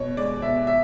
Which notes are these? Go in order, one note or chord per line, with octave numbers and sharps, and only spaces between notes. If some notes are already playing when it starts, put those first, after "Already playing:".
Already playing: B2 C#5
G#3 D5
B2 E5
E5